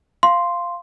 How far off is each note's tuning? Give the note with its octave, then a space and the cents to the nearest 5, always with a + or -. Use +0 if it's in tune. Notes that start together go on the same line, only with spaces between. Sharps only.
F5 -5 C6 +0